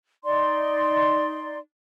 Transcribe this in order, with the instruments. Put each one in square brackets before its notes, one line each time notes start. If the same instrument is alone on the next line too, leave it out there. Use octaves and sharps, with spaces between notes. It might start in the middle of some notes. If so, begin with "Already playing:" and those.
[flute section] D#4 D5 C6